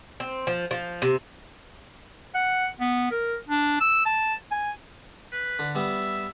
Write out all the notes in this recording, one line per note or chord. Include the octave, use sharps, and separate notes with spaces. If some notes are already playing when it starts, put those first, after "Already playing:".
C4
F3
F3
C3
F#5
B3
A#4
D4
E6
A5
G#5
B4
D3
G3 B3 E5